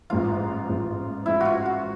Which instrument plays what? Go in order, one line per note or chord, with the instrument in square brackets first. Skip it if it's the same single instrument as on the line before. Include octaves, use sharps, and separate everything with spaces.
[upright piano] A1 G#2 F3 [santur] F4
[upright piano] A1 G#2 F3
[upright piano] A1 G#2 F3 [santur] E4
[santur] F4 F#4
F#4